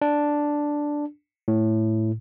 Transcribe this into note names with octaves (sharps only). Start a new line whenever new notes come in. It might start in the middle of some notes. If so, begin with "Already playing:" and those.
D4
A2